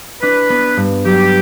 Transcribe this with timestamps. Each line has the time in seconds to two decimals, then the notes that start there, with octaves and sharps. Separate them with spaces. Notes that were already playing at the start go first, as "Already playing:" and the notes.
0.22 D4 B4
0.50 B3
0.77 G2
1.05 F#3 G4